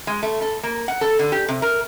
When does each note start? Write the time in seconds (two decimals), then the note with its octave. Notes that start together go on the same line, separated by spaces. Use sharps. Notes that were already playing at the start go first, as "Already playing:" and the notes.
0.07 G#3
0.23 A3
0.42 A4
0.63 A#3
0.88 F#5
1.01 A4
1.19 D3
1.32 G4
1.48 C3
1.62 A#4